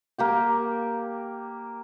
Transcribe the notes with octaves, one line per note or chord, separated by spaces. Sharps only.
A#3 G4 G5